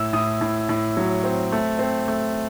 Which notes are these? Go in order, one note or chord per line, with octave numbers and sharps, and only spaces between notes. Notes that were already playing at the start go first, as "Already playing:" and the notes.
Already playing: A2 E6
A2 D#6
A2
A2
F#3
C4
A3
C4
A3